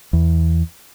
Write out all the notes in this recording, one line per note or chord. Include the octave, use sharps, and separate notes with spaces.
E2